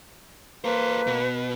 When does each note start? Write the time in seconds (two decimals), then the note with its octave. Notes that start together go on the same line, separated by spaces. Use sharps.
0.65 A#3 A4 B4 C5
1.07 B2